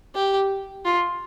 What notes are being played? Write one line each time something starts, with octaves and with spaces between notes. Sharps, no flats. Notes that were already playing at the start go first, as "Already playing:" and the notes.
G4
F4